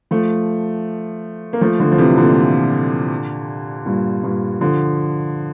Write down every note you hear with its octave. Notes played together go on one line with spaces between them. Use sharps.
F3 A3
A#3
F3 A3
D3 F3
F3
C3 E3
A#2 D3
G2 A#2
G2 A#2
D3 F3